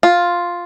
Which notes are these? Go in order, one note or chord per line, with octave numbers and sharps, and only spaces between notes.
F4